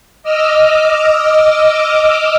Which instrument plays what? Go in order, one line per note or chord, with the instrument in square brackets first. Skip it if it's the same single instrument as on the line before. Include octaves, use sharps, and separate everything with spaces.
[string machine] D#5 D6 E6 F6